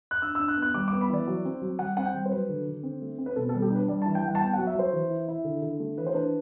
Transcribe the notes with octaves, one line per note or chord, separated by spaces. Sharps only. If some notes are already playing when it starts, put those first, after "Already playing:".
F#6
D4 E6
E6
D4
F#6
B3
F#6
G3 D6
D6
B3
B5
E3 D5
F#3
C4
F#3
G3 F#5
C4 F#5
G5
G3
C5
F#3 B4
D3
D3
C4
A3
C4
B4
B2 A4
A4
G3
G4
D4 B4
G3 D5
A5
E3
G5
G3 F#5
A5
B3 G5
F#5
F#3
E5
F#3 C5
E3
E4
E4
D3
D3
A3
E3 B4
C5
D4 B4